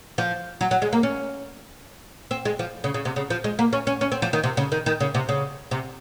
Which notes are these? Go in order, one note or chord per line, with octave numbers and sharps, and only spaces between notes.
F3
F#3
F#3
G#3
A#3
C#4
C4
G#3
F3
C#3
C#3
C3
C#3
F3
G#3
A#3
C#4
C#4
C#4
C4
F3
D#3
C3
C#3
D#3
D#3
C#3
C3
C#3
C3